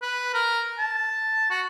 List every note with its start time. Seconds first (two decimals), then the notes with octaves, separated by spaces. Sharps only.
0.02 B4
0.34 A#4
0.78 A5
1.50 F#4